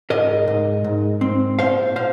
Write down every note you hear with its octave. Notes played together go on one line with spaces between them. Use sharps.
G#2 A#4 D#5
G#2
G#2
C4
A#2 C5 F5
C5 F5